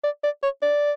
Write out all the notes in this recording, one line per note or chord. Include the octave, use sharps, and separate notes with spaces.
D5
D5
C#5
D5